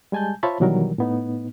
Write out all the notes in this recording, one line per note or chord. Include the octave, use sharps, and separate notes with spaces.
G3 G#3 G#5 A5 G6
F4 C5 C#5 E5 A5 B5
B2 D#3 E3 F#3 G3 A#4
A2 B3 D#4